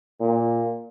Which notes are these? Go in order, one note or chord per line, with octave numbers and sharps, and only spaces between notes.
A#2